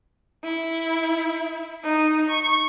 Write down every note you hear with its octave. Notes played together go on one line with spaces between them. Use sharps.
E4
D#4
C#6